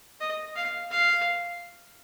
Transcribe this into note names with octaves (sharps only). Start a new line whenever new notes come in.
D#5
F5
F5